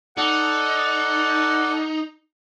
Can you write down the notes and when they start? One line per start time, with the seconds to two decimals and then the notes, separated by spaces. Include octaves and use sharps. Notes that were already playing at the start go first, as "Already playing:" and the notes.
0.17 D#4 A4 D5 F#5